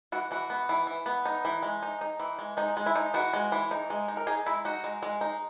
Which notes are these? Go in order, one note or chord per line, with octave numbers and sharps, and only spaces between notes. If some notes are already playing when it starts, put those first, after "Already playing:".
E3 F#4
E3 F#4
B3
E3
E3
B3
D#4
E3
G#3
D#4
D#4
E3
G#3
G#3 D#4
G#3
E4
D#4
E3 F#4
G#3
E3
D#4
G#3
D#4
A#4
D#4 G#4
G#3 E4
D#4 F#4
G#3
G#3
D#4